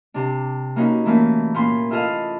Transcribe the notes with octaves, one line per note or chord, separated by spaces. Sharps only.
C3 D4
A#3 B3 C#4 D#4 F#4
E3 A3 A#3 C#4
A#2 A#3 B3 C#4 C6
E4 F4 G#4 A4 D#5 F5